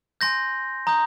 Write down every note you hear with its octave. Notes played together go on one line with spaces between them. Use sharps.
G#5 C6 G6 A#6
A#5 D#6 G6